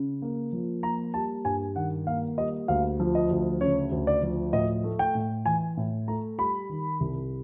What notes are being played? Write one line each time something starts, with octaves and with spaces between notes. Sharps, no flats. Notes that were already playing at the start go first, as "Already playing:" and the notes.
Already playing: C#3
A#3
F3
A#3 A#5
G3 A5
G2 G#5
D#3 F#5
A#3 F5
G3 D#5
D2 F5
F3
D#5
D2
C#3 C#5
D2
D5
F3
A2 D#5
A3
G5
A2
E3 G#5
A2
A3 A#5
G3 B5
D#3
C2